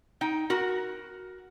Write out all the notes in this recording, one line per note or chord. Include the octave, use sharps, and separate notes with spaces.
D#4 G5
F#4 A#4